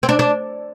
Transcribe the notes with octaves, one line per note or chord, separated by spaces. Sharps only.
C4
D4
D4